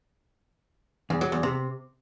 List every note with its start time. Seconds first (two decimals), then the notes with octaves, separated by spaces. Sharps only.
1.10 E2
1.21 F#3
1.32 E2
1.43 C3